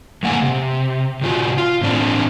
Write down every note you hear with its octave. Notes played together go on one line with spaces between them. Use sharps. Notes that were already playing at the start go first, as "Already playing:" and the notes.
F2 A2 A#3 F#5 G#5
C3
C3 F4 F#4
F4
A2 E3 C4 D4